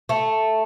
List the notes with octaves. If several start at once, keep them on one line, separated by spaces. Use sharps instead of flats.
A3